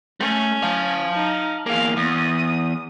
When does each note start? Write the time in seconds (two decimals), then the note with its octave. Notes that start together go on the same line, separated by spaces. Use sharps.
0.20 A3 C#4 A4
0.63 F5 A5
1.15 D#4
1.66 E2 A#3 G#4 F5
1.97 E2 D#6